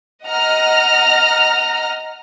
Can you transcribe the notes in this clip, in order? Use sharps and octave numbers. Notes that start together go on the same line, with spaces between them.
D#5 F#5 A#5 F6